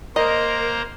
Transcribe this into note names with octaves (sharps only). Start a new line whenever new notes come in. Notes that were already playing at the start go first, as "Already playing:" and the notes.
A#3 A#4 C5 D#5 A#5